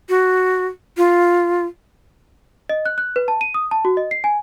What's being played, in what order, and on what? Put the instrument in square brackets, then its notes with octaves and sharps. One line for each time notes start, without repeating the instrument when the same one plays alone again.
[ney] F#4
F4
[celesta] D#5
F#6
F#6
B4
A5
D#7
D#6
A5
F#4
D#5
C7
G#5